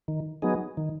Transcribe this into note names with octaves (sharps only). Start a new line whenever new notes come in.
D#3
F#3 B3 D#4 G#4
D#3